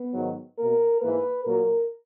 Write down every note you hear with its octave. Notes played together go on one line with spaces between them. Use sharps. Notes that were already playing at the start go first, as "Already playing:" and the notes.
Already playing: B3
G#2 D#3 F#3
B2 A#3 A#4
G#2 E3 A#3 B4
A#2 F#3 A#3 A#4